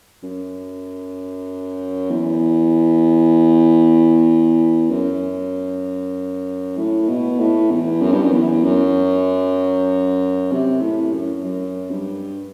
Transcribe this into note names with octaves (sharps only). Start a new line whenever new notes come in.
F#2
E2
F#2
A2
B2
A2
E2
F#2
G2
F#2
E2
F#2
C3
A2
F#2
F#2
G2